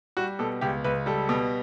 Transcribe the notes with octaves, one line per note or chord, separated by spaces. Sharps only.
G3 F#4
B2 A4
C#2 G4
C#2 B4
G3 A4
B2